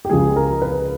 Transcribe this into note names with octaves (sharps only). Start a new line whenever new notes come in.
G4
C#2 C#3 F3 G#3 G#4
A#4
B4